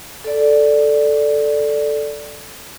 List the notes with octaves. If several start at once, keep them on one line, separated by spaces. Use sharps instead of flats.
A4 D5